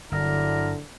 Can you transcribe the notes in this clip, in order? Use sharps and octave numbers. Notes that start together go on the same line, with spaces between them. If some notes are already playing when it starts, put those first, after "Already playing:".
G1 D3 F#3 D4 E4 A#4